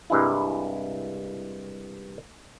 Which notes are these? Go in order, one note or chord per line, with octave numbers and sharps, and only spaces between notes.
C2 G2 G#3 E4